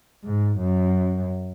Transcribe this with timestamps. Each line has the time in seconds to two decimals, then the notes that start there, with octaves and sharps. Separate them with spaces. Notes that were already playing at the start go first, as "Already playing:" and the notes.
0.24 G#2
0.59 F#2